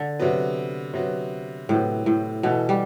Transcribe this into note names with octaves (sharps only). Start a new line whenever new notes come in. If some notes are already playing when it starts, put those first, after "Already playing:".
Already playing: D3
C3 F#3 B3
C3 F#3 B3
A2 C3 F#3 B3
A2
B2 E3 B3 E4 A4
G3